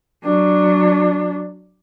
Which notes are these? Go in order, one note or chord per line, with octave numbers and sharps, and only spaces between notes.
F#3 D4